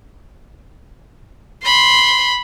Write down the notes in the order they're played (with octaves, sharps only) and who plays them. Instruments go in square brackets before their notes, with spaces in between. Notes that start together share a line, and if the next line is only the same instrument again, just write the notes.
[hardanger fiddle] B5 [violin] C6